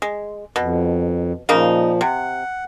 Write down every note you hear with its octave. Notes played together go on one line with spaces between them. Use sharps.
G#3
F2 B2
A#2 C#3 F3 A#3 D#4
C3 F#5